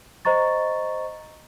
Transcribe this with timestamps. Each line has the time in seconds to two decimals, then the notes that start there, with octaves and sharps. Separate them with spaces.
0.25 C5 D#5 A#5 C#6 A6